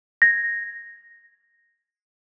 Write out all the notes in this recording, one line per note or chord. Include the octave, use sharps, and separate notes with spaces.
G#6 A#6